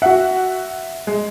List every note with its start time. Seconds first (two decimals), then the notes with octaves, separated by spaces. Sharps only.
0.02 F#4 E5 F#5
1.07 G#3